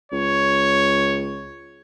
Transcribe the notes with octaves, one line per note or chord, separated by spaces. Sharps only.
C#2 C#5